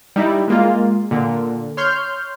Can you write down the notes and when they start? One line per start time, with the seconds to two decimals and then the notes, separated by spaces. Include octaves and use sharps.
0.16 G3 D#4 E4
0.48 G#3 A#3 F4
1.11 A#2 D3
1.77 C#5 C6 F6 G6